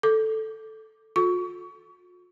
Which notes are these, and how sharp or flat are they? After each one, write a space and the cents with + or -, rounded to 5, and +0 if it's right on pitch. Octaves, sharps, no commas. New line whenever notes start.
A4 +0 D6 +0
F4 +45 A4 -20 C#6 +25